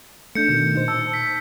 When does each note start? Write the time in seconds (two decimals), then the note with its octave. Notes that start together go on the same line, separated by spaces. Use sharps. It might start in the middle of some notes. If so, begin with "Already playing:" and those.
0.35 A3 D4 G6 C#7
0.48 B2 D#3
0.75 A#2 D#4 C5
0.88 A5 E6
1.14 B6